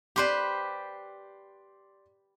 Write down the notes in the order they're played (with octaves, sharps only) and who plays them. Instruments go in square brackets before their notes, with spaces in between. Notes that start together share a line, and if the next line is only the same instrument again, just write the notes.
[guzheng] G4 B4 C5 [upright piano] D5 C6 D6